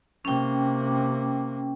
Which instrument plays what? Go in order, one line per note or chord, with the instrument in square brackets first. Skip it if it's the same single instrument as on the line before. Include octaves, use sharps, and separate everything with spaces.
[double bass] C3 A#3 [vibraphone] C#4 G5